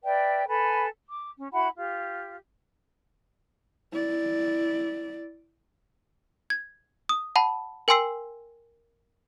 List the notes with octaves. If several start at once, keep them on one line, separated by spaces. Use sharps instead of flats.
B4 D5 E5 G5
A4 B4 G#5 B5
D6
C#4
E4 F#4 F#5 B5
F4 G4
E4 D5
G#6
D#6
F#5 A5 B5
A#4 G5 G#5 C6 E6 C7